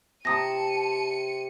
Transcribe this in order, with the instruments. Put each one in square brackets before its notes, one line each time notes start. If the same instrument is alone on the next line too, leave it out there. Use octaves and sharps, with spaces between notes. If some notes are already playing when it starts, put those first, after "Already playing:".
[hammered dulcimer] C3 [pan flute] A5 [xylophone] A#5 D#6 A#6 [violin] C#7 D#7